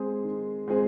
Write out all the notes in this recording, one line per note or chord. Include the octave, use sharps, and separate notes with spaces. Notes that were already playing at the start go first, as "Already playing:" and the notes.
Already playing: G#3 C4 G#4
D#3
G#3 C4 G#4